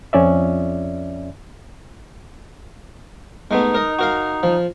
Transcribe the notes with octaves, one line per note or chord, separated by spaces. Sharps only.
F2 C#4 D5 E5
G#3 A3 B3 D#4
A#4 D#5
F#4 A#4 F5
F3